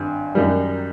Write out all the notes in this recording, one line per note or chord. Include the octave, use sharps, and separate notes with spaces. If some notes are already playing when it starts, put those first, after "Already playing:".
Already playing: G#1 G2
F#2 D#3 G3